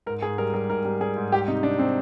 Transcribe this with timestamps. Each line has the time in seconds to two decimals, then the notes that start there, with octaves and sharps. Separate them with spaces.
0.06 G#2 A#4
0.22 G#2 G#4
0.38 G3 A#4
0.54 G3 A#4
0.70 G#2 A#4
0.85 G3
1.01 G3 G#4
1.17 G#2
1.32 G3 G4
1.48 C3 D#4
1.63 C3 D4
1.79 C3 C4